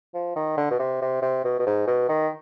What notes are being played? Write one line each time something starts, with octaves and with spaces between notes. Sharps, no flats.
F3
D#3
D3
B2
C3
C3
C3
B2
B2
G#2
B2
D#3